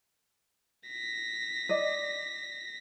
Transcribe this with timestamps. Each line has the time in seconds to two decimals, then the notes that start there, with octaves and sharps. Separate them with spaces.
0.89 A#6 B6
1.69 D5 D#5